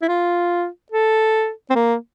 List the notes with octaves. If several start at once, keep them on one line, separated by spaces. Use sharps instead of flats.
E4
F4
A4
C4
A#3